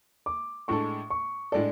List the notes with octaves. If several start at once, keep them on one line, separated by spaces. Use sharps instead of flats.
D6
A2 G#3 D4 A4 C#6
C#6
A2 G#3 D4 A4 D5